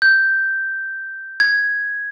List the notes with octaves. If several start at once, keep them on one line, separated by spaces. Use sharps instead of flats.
G6
G#6